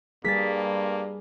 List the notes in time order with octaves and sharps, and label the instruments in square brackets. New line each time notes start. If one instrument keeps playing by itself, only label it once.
[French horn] G2 [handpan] G3 G#4 [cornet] A#3 [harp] A6 B6